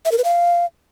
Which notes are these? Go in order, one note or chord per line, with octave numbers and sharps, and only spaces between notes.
E5
A#4
B4
F5